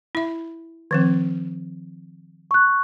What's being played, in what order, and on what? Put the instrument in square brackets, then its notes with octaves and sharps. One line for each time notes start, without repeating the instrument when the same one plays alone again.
[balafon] E4 E5
D#3 F3 C4
[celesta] C#6 F#6